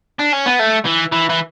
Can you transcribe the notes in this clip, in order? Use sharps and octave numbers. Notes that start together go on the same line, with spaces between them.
D4
C#4
B3
A3
E3
E3
E3